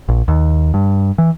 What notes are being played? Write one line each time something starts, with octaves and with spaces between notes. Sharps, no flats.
A#1
D#2
G2
E3